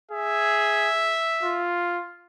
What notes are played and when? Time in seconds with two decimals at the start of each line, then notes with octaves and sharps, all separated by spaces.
0.11 G#4 E5
1.43 F4